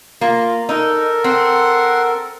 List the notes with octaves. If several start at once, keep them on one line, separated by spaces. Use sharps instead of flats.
A#3 F4
D#4 A4 A#4
C4 F#5 C6